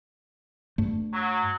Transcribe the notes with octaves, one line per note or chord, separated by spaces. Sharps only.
G2 A3
F#3